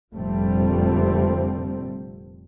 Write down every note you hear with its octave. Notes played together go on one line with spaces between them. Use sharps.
F1 A#2 D3 G3 A3 C4